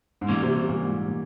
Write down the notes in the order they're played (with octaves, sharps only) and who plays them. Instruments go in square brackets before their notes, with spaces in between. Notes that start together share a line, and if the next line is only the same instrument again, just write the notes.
[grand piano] G#2
[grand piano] A#2 [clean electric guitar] E3 G3 A#3 C#4
[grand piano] C3
C3
A#2
G#2
A#2